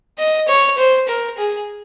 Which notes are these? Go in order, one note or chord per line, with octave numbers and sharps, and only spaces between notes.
D#5
C#5
C5
A#4
G#4